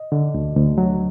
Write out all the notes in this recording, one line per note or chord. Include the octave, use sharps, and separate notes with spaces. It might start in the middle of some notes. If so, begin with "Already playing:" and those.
Already playing: D#5
D3
D2
D2
F#3